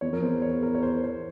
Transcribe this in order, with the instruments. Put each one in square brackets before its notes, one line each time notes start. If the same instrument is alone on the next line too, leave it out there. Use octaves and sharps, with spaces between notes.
[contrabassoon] E2 [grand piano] C#5
[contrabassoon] F2 [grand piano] A#4
[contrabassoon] E2 [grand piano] C5
[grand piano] C#5
A#4
C#5
C5
C5